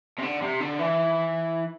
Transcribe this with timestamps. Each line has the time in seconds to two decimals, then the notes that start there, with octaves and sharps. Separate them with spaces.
0.18 C3
0.22 D3
0.42 C3
0.60 D3
0.79 E3